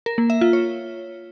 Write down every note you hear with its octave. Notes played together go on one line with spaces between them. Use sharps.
A#4
A#3
E5
F4
C#5